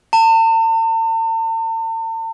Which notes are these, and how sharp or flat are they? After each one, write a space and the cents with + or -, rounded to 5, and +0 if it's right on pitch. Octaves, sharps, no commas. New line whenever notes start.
A5 +45